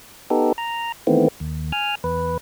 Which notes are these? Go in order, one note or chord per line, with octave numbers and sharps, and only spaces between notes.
B3 D#4 G4 A4
A#5
D#3 E3 A3 B3 C4
D#2
G#5 F6
E2 B4